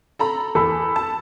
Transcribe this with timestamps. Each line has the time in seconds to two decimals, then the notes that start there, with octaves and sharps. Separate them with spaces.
0.19 A4 A#5 B5
0.55 E2 A4 B5
0.96 A5